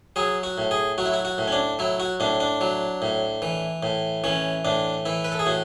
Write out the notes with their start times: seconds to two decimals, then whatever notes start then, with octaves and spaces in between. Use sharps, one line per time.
0.16 F#3 G#4
0.43 F#4
0.58 A2
0.71 G#4
0.98 F#3 F#4
1.06 E4
1.13 F#4
1.25 F#4
1.38 A2
1.48 C#4
1.52 D4
1.79 F#3 E4
2.00 F#4
2.20 A2 D4
2.40 D4
2.61 F#3
3.02 A2
3.42 E3
3.83 A2
4.24 E3 C#4
4.65 A2 D4
5.05 E3 E4
5.24 B4
5.32 A4
5.39 G#4
5.46 A2 F#4